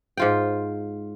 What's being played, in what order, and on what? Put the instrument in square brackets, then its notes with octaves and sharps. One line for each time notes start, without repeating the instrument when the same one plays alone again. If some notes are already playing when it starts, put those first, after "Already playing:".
[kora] G#2 F4 G5